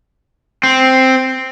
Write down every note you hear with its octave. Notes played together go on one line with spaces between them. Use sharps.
C4